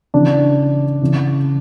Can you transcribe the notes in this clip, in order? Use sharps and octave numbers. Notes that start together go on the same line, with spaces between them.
C#3 E3 D4
C#3 E3